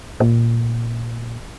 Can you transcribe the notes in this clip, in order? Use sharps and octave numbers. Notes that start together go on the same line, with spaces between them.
A#2